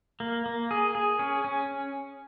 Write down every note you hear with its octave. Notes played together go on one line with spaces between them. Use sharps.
A#3
A#3
G#4
G#4
C#4
C#4